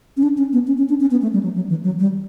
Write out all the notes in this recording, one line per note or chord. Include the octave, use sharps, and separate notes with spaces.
C#4
D4
C#4
B3
C#4
C#4
D4
C#4
B3
A3
G3
F#3
F#3
E3
F#3
G3